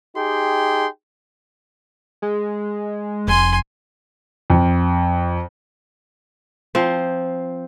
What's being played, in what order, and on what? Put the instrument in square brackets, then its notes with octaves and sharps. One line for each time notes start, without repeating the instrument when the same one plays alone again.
[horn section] D#4 G4 G#4 G5 C6
[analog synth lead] G#3
[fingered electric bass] F1 [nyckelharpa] G#5 C6
[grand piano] F2
[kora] F3 C4